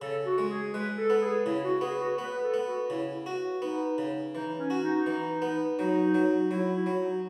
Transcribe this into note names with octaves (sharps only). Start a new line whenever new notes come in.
C#3 A4
F#4
G#3
G#4
G#3 B4
A4
B3
G#4
C#3 E4
F#4
B3 G#4
F#4
B3 B4
A4
B3
F#4
F#4
C#3 E4
E4
F#4
B3 D#4
C#3
E3 D#4
C#4
F#4
D#4
E3
B3
F#3 D#4
F#3
F#3 E4
E4
F#3
D#4